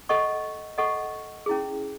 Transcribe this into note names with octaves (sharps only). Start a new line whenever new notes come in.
A4 D#5 F#5 C#6
A4 D#5 F#5 C#6
C#4 E4 G#4